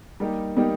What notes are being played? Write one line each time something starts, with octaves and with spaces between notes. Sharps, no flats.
G3 A#3 D#4 G4
G3 A#3 B3 D#4 G4